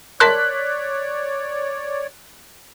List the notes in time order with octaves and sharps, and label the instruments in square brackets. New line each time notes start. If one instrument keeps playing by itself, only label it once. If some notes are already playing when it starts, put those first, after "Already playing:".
[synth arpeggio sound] A#4 A5 C6 [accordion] C#5 D5 [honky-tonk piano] F#6 B6